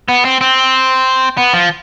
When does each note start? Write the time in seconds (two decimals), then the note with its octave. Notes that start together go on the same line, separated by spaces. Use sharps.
0.08 B3
0.25 C4
0.41 C4
1.38 B3
1.53 F3